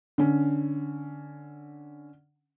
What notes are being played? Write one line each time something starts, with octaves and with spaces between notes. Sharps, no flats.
D3 C#4